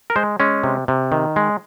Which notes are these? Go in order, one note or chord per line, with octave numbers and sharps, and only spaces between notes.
A#4
G#3 C5
G#3 C#4
C3
C3
D#3
G#3